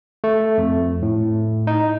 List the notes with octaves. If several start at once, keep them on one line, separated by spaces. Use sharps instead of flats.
A3
F2
A2
D#4